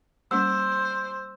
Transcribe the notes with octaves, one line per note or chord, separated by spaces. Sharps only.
G3 A#3 C#4 C5 E6